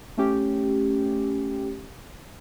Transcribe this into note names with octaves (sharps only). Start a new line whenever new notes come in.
A3 C#4 G4